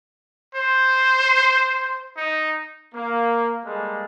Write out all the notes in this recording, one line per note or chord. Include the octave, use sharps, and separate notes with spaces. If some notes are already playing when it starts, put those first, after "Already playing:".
C5
D#4
A#3
G3 G#3 A#3 A4